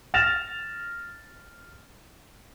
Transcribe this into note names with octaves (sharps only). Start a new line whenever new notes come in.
F6 A6 A#6 E7 F7